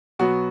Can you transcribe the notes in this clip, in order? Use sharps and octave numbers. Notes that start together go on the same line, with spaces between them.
B2 F#3 B3 F#4